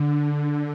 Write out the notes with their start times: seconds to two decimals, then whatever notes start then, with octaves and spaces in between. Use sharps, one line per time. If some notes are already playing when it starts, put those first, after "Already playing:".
Already playing: D3